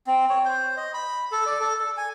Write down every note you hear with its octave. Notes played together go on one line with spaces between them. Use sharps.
C4
C#5
C5
D#5
B5
A4
D5
A4
A4
G#5